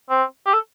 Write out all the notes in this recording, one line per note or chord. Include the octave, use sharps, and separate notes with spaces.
C4
G4
A4